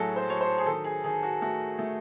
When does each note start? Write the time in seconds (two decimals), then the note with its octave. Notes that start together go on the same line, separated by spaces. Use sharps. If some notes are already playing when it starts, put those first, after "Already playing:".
Already playing: A2 F#3 A3 F#4 G#4 A4
0.16 C5
0.28 F#3 C#5
0.41 C5
0.58 G#4
0.66 D#3 A4
0.84 G#4
1.04 D#3 G#4
1.23 F#4
1.42 A3 F#4
1.79 A3